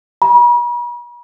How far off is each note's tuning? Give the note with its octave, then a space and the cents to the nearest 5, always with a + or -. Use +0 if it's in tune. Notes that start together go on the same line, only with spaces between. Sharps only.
B5 -45